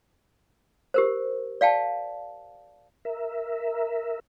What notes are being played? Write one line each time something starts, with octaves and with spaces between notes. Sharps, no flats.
G4 A#4 C5
D5 F5 G5 A5
A#4 E5